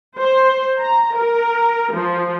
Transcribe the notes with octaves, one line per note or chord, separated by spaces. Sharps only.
C5
A#5
A#4
F3